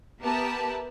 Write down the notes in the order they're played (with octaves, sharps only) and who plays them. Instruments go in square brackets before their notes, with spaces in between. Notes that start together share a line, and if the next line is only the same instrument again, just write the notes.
[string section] B3 G4 A#4 B4 E5 A5